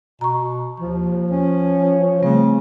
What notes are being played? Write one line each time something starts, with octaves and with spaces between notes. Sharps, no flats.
B2 A#5 C#6
D#2 F3
C#4 C#5
C#3 G3 A3 C4